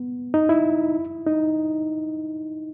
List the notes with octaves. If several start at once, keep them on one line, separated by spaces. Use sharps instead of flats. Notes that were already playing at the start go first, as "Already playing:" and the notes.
Already playing: B3
D#4
E4
D#4